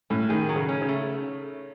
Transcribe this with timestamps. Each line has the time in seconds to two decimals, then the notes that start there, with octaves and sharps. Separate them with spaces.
0.10 A2 C#4
0.29 D#3 G#4
0.49 F#3
0.56 C#3
0.69 C#4
0.82 C#3
0.89 A3